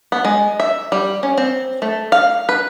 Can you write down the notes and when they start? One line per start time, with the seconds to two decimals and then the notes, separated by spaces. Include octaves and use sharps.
0.12 B3
0.25 G#3
0.60 E5
0.92 G3
1.23 C#4
1.38 C4
1.82 A3
2.12 F5
2.49 B4